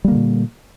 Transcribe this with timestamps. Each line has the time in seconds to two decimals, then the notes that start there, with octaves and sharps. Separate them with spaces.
0.04 G3
0.08 A#3
0.11 D3
0.15 A#2